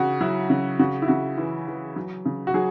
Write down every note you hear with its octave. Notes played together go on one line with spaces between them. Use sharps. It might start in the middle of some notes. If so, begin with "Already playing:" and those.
Already playing: C#3 F#4
F#3 E4
C#3
C#3 F#4
E4
C#3 F#4
E3
E3
F#3
C#3
F#4
F#3 G#4